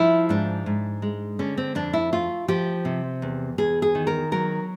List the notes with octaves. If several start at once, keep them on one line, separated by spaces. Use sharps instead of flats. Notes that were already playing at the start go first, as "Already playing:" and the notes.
Already playing: F3 E4
G#2 D4
G#2
G#3
D3 C#4
C4
F2 D4
E4
A3 F4
F3 G4
C3
E2
E2 G#4
G#4
D#3
A#4
F#3 A#4